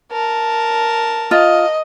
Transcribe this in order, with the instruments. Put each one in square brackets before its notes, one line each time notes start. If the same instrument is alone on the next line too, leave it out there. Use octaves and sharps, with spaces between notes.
[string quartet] A#4 A5
[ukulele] F4 [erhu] D#5